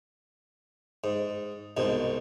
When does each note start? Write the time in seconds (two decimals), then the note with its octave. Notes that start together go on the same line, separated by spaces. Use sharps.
1.04 G#2
1.77 C2 G#2 B2